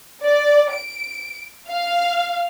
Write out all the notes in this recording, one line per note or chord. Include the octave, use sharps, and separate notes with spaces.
D5
D7
F5